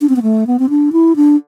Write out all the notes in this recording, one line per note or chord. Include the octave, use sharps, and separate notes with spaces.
D4
C4
B3
A3
B3
C4
D4
E4
D4